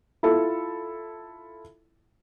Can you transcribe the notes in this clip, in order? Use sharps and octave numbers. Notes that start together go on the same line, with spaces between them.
E4 F4 A4